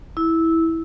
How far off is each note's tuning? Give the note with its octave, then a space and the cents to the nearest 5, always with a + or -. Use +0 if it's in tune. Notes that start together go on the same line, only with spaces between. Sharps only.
E4 -10